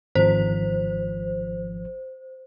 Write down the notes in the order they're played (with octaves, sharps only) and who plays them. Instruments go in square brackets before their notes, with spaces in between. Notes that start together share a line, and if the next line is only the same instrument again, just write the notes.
[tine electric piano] G#1 F3 [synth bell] C5